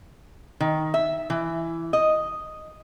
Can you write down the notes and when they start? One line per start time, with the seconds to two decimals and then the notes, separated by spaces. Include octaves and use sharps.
0.60 D#3
0.94 E5
1.30 E3
1.93 D#5